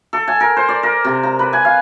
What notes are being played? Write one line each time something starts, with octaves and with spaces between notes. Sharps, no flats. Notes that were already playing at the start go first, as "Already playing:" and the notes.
A4
G#5
A#4
C5
D5
A#4
C3
A#5
B4
G#5
F5